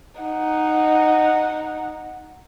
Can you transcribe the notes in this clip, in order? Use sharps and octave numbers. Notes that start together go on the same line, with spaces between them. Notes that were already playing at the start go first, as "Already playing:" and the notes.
D#4 F#5